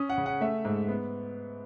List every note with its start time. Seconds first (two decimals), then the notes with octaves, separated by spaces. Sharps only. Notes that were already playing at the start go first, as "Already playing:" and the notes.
Already playing: C#4 D#6
0.09 F#5
0.18 C#3
0.26 F#5
0.41 A3 E5
0.65 G#2
0.88 B3